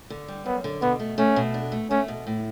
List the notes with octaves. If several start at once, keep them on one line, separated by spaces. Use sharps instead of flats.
D3
G3
F#2 B3
D3
B2 B3
A3
A3 C#4
B2
D4
A3
A3 C#4
B2
A2